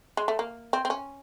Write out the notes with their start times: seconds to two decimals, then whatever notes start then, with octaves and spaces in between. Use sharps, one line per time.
0.17 G#3
0.28 A3
0.39 A#3
0.73 C4
0.85 C4
0.90 C#4